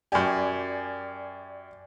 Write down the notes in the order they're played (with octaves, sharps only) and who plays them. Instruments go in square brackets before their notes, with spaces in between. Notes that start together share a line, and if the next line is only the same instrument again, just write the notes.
[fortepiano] F#2 G4 [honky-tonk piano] D5 G#5